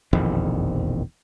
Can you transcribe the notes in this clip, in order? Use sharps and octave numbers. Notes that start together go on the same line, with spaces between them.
E1 A#1 F2 D#3